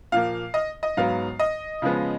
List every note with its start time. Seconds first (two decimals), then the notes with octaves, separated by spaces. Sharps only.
0.12 A#2 F3 A#3 F5
0.54 D#5
0.83 D#5
0.97 G#2 F#3 B3 F5
1.39 D#5
1.82 C#3 F3 G#3 B3